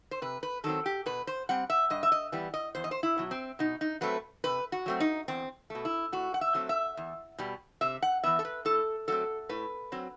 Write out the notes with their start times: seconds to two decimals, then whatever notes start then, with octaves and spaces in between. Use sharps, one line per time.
0.11 C5
0.22 C3 B4
0.43 B4
0.64 D#3 F#3 C4 A4
0.86 G4
1.06 B2 B4
1.27 C5
1.49 G3 C4 F#5
1.70 E5
1.90 G2 D#5
2.03 E5
2.12 D#5
2.32 E3 G3 B3
2.54 D#5
2.75 E2 C5
2.84 D#5
2.91 C5
3.03 E4
3.18 B2 F#3
3.31 C4
3.59 B2 D#4
3.81 D#4
4.01 F#3 A3 C4 B4
4.44 C3 B4
4.72 F#4
4.86 F#3 A3 C4
5.00 D#4
5.28 E2 C4
5.70 B2 A3
5.85 E4
6.12 A2 F#4
6.34 F#5
6.41 E5
6.54 F#3 A3 C4
6.69 E5
6.97 E2
7.38 B2 G3
7.81 C3 E5
8.02 F#5
8.23 E3 B3 E5
8.39 A4
8.45 B4
8.65 A2 A4
9.08 F#3 A3 C4 A4
9.49 A2 B4
9.92 F#3 C4